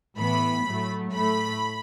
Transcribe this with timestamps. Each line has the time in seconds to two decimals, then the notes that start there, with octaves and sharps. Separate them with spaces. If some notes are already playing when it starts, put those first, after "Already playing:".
0.16 A2 E3 B3 B5
0.65 A2 F#3 A3
1.13 A2 A3 B5